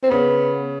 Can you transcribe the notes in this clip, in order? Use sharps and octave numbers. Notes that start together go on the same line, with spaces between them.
C4
C#3 B3